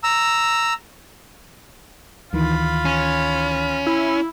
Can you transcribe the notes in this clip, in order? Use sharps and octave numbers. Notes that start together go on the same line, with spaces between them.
A#5 E6
D2 D#3 E3 F4 B5
C#4
E4